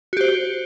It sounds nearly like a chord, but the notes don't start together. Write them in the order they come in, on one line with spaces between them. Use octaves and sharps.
F#4 G4 C5